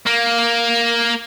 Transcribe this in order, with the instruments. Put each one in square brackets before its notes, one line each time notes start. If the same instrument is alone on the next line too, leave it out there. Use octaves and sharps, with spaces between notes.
[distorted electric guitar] A#3